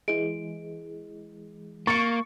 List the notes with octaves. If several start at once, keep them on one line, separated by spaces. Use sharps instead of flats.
E3 G#3 D7
A#3 C#6 A6 C#7